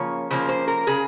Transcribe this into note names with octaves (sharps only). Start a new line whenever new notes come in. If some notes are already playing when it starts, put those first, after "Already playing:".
Already playing: C#3 F3 A#3 C#5
C#3 F3 A#3 C5
C5
A#4
C#3 G#4